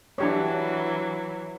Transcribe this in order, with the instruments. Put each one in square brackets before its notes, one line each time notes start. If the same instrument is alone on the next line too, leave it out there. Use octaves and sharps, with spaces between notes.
[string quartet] E3 F#3 [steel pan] D4 G4 C#5